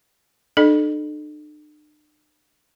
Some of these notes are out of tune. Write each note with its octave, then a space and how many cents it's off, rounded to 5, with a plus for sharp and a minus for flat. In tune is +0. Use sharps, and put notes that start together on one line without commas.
D4 +45 A4 -20 D#5 -45